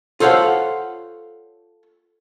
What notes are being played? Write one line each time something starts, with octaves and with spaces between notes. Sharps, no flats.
F4 A4 C5 C#5 F5 F#5